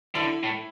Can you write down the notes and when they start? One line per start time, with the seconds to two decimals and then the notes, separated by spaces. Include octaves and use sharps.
0.15 D3 E4
0.43 A2